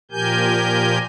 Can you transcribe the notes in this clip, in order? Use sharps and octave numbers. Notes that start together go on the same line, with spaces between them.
A#2 F3 G4 A#4 G#5 G6